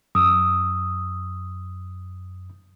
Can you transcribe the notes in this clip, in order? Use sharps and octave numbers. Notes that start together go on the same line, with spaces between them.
F#2 D#6 E6